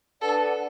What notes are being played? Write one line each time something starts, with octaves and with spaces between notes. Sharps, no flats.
D4 A4 B4 D5 F#5